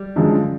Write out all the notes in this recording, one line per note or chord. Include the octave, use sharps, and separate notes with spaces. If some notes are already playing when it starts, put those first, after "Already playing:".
Already playing: G3
F#2 D3 F3 G#3